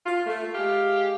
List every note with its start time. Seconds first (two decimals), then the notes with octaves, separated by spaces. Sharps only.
0.06 F4
0.27 A3
0.55 G#3 G4 F5